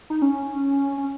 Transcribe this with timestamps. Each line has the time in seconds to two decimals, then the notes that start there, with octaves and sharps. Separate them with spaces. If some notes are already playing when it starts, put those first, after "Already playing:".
0.10 D#4
0.22 C#4
0.97 C#4